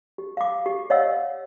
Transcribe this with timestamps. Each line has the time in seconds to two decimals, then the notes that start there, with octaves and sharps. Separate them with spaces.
0.18 G4
0.37 F5 D6
0.66 G4
0.90 C#5 D#5 F5 F#5 E6